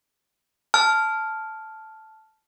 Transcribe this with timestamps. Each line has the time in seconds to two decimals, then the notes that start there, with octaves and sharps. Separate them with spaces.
0.74 A5 F6